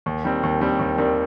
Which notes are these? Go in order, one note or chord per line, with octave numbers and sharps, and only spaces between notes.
D#2
D#3 G3 C4
D#2
D#3 G3 C4
D#2
D#3 G3 C4